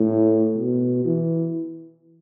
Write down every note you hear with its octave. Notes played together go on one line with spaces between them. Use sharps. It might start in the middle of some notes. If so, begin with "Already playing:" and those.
Already playing: A2
B2
E3